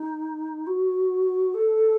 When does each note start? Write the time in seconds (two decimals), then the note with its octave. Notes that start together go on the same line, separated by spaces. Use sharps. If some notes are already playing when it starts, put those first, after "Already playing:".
Already playing: D#4
0.66 F#4
1.54 A4